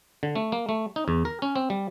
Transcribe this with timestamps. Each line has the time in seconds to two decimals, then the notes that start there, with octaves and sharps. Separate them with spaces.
0.23 D3
0.36 A3
0.52 A#3
0.69 A3
0.96 D#4
1.08 E2
1.25 A#4
1.42 C#4
1.56 C4
1.70 G3